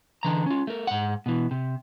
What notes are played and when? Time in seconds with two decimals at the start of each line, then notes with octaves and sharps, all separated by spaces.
0.23 D3 E3 A#5
0.46 C#4 F4
0.67 A3 A#4
0.87 G#2 F#5
1.26 B2 E3
1.51 C3